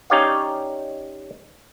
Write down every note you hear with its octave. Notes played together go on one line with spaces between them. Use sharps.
C#4 D#4 G4 C#5 D5 F5